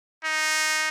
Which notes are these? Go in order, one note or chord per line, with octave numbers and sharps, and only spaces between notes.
D#4